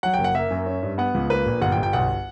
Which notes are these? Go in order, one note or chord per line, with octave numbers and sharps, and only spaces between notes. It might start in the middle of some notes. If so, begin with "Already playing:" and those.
F#3 F#5
G5
F#1
F#5
A#3 E5
F#2
C#4
G2
B3 F#5
C#2
A#3 B4
A#1
G1 F#5
G5
G1
G5
B1 F#5